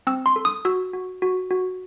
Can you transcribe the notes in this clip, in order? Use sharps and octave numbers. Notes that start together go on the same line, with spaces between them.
C4 E6
C6
A4
D#6
F#4 E6
F#4
F#4
F#4